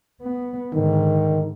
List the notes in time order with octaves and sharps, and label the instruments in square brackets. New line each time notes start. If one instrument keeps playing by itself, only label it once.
[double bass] B3
[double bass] G#2 D3 [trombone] D#3